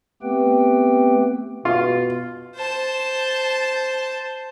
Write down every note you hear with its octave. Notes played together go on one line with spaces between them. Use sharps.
A3 B3 C4 G4 B4 G5
B2 F4
C5 A5